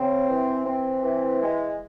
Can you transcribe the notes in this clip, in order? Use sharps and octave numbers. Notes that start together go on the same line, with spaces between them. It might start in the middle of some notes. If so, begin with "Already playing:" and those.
Already playing: C#3 C4
E3
C4
E3
G#3